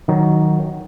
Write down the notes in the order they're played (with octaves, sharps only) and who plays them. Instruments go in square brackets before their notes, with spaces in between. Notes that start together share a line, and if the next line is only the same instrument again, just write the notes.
[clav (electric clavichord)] D#3 F#3